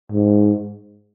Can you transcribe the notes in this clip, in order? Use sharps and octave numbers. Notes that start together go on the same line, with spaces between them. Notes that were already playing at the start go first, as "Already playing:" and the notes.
G#2